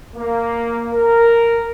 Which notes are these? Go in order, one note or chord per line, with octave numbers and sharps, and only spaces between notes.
A#3
A#4